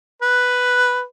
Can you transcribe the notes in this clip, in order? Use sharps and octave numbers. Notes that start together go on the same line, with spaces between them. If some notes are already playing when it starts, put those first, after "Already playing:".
B4